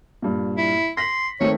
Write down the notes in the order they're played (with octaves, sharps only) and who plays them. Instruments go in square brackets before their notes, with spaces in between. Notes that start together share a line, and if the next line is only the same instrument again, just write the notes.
[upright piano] G2 A#2
[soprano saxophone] E4
[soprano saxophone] C6 [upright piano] A#6 B6 F#7
[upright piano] D#3 A3 C4 [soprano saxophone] C#5